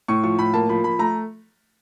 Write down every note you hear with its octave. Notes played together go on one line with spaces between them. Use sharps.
A2 C#6
F3 C#6
A2 B5
A#3 A5
F3 B5
F3 B5
A3 A#5